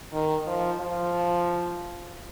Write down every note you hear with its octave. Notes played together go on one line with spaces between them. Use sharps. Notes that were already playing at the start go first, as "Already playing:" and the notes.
D#3
F3
F3